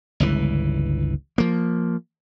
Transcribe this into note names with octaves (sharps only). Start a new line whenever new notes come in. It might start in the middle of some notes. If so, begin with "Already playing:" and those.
G1 C#2 E3
F3 A#3